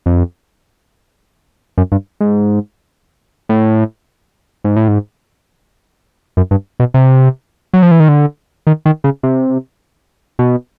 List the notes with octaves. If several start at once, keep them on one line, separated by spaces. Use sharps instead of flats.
F2
F#2
G2
G#2
A2
G#2
A2
G#2
F#2
G2
B2
C3
F#3
F3
E3
D#3
D3
D#3
D#3
C#3
C3
B2